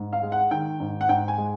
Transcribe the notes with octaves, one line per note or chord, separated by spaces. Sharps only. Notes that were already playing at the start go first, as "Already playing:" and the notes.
Already playing: G#2
F5
G#3
F#5
D#3 G5
G#2
F#5
G#2 G5
G#5
G#3